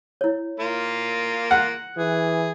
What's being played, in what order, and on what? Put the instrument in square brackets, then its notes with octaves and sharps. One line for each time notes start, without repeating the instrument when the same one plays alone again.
[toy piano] E4 C#5
[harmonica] A#3 F4
[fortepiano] F#5
[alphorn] E3 [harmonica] G#4